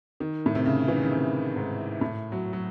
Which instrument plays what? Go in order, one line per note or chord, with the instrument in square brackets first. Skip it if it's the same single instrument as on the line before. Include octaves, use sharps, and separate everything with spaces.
[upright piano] D#3
A2
C3
C#3
E3
D#3
C#3
C3
G#2
A2
F#3
F#3